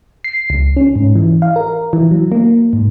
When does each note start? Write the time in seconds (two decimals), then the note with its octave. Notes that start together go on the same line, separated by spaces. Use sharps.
0.24 C7
0.50 C#2
0.76 C#4
0.95 G#2
1.16 E3
1.42 F5
1.56 A#4
1.93 E3
2.11 F#3
2.32 A#3
2.73 G#2